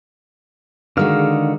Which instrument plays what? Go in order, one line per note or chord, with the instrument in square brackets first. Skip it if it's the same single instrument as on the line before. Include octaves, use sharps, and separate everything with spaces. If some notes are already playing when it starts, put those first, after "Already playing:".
[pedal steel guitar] D3 F5 [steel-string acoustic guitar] D#3 G#3 F#4